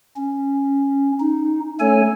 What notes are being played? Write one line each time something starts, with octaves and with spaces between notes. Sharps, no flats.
C#4
D#4
A3 C#4 A4 C#5 G#5